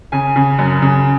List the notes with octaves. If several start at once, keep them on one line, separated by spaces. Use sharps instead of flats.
C#3 G#5
C#3
F#2
C#3